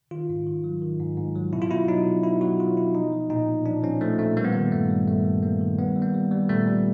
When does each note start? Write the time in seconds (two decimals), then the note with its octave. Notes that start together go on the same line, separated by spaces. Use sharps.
0.11 D#3 F4
0.29 G#2
0.47 D#3
0.64 F#3
0.82 D#3
1.00 G#2
1.17 G#2
1.36 F#3
1.53 B2 E4
1.62 F4
1.71 B2 E4
1.88 F#3 D#4
2.06 B2
2.23 B2 E4
2.41 F#3 F#4
2.59 F#3 F4
2.77 B2 E4
2.95 F3 D#4
3.12 F3
3.30 A#2 D#4
3.48 A#2
3.66 F3 D4
3.83 F3 C#4
4.01 F3 A3
4.19 A#2 A3
4.37 G3 A#3
4.44 B3
4.52 D#3 A#3
4.72 G2 A3
4.90 G3
5.07 G2 A3
5.25 G3
5.43 G3 A#3
5.61 D#3
5.79 G3 B3
5.96 G3
6.02 A#3
6.14 G3
6.31 G3
6.49 A#2 A3
6.67 G3